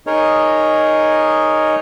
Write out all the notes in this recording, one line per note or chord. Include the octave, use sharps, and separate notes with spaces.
D#4 G#4 A#4 C#5 D#5